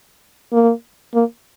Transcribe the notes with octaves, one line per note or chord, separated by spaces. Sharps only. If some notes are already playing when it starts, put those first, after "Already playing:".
A#3
A#3